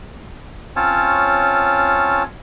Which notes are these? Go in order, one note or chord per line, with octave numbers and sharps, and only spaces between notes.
C4 C#4 F4 C#5 A5